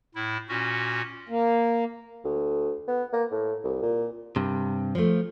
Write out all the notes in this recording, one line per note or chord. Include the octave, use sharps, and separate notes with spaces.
A2 E4
A#2 C#4 F#4
A#3
D2
B3
A#3
A2
C2
A#2
G2 C3
F3 A3